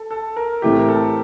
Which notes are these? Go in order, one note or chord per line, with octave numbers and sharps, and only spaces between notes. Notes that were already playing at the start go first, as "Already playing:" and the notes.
Already playing: A4
A4
A#4
A2 E3 A3 C4 E4 G4
A#4
A4